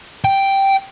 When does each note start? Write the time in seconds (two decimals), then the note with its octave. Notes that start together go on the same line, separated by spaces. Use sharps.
0.25 G5